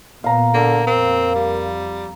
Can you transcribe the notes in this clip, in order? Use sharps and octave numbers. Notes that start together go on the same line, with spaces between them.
A#2 B3 F5 A#5
D3 A#3
F2 A#3 C4
G3